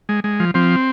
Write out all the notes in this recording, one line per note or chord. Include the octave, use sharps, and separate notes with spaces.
G#3
G#3
F3
F3 C4